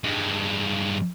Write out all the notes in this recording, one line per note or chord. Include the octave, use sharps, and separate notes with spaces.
G2 G#3